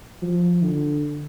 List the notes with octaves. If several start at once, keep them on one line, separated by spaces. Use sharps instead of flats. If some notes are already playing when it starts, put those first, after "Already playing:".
F3
D3